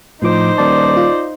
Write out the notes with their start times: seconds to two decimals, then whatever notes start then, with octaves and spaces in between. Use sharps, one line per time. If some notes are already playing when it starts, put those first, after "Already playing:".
0.22 A2 F3 D#4 C5 D6
0.58 D#1 D5 A5
0.97 F4